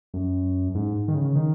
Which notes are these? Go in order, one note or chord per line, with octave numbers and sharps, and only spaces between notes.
F#2
G#2
D#3
C#3
D#3